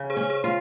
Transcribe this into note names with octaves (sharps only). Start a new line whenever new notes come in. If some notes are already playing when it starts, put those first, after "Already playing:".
Already playing: C#3
G#4 C5
C#4
G#4 C5
F4